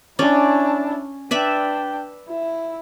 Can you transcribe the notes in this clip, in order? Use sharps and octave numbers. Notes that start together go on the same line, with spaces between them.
C#4 D4 E4 D5
D4 B4 D5 E5 G5
E4